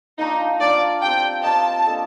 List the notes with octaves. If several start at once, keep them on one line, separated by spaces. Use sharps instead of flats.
A#3 D4 D#4 F4
A#3 D4 F4 D5
C4 G4 D5 G5
C4 F4 A#4 D#5 A5
A#3 D4 A4 D#5